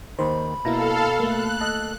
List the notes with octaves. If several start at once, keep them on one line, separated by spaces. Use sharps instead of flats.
D#2 D#3 C5 B5
B2 A#3 E4 A4 F5 A#5
A3 A#3 F#6
A4 D#5 A5